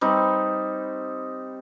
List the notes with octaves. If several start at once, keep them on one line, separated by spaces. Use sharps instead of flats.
G3 C4 D#4